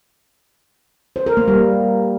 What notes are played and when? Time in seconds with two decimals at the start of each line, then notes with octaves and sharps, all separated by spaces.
1.16 C5
1.26 A#4
1.37 A#3
1.48 G3